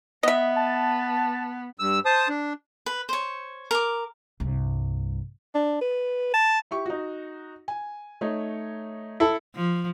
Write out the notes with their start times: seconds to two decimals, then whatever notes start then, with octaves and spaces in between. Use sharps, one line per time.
0.23 B3 D#5 E5
0.56 A5
1.79 G2 E6
2.05 C5 A5 D#6
2.29 D4
2.86 B4
3.09 C5 C#5
3.71 A#4 D6
4.40 C2 G2
5.55 D4
5.81 B4
6.34 A5
6.71 E4 G4 C#6
6.86 D#4 F#4
7.68 G#5
8.21 A3 D#4 C#5
9.20 E4 A4
9.56 F3